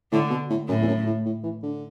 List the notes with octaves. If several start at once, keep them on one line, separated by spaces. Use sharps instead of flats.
A2 D3
B2
A2
F#2 A2
E2
F#2
A2
A2
E3
D3